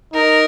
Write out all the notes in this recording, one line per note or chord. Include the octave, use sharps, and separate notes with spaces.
D#4 A#4